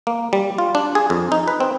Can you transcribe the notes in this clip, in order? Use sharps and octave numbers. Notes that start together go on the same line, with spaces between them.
A#3
G3
F4
D4
G#4
F2
D#4
B4
C4